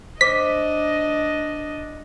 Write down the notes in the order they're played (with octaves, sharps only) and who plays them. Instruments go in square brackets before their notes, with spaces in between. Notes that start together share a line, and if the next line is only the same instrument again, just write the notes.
[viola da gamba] D4 D#5 [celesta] C5 D6 [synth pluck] B6